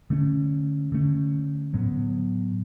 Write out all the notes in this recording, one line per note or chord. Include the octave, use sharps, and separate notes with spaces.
D3 A3 C#4
D3 A3 C#4
A2 F#3 B3